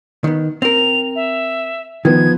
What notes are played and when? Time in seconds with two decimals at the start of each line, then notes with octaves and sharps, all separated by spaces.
0.24 D#3 B3
0.62 C4 A#4 F7
1.16 E5
2.05 D#3 F3 B3 G#6